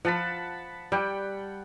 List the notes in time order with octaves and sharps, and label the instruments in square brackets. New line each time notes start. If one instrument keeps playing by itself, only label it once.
[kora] F3 [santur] F#5 A5 B5
[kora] G3 [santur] F#5 G5